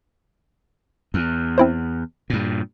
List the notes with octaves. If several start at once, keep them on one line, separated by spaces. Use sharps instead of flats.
E2
C4 E4 C5
G2 A#2